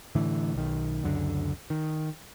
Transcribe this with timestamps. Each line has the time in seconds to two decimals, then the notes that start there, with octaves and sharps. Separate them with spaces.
0.15 A2 D3 E3
0.55 B1 D#3
1.03 C#2 F#2 D3
1.70 D#3